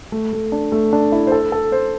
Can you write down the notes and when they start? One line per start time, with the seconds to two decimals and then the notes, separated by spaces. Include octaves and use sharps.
0.12 A3
0.33 A3
0.52 D4
0.72 A3
0.93 D4
1.12 E4
1.27 C5
1.32 A4
1.52 A4
1.72 C5